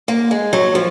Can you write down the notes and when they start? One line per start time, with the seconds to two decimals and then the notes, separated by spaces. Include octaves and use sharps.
0.08 A#3
0.31 G#3
0.53 F#3
0.75 F3